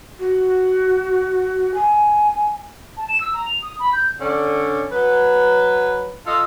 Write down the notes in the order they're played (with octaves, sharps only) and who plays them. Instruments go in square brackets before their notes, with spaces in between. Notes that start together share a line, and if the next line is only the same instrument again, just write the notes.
[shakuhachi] F#4
G#5
[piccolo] A5
E7
E6
A#5
F7
D#6
B5
G6
[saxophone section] D3 C#4 D4
F#3 B4
F4 A4 D#5